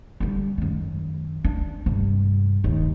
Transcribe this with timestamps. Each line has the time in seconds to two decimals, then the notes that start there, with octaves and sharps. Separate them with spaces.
0.20 D3 G3
0.58 F#2 D#3
1.45 D4
1.86 G2 C3
2.64 D1 D#2